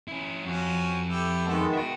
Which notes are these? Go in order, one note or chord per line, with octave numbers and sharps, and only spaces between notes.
C#4 E4
F2 C#4 F#4
E4 G4 A4
D#3 G#3 A3 B3 A4
F#4 E5 G5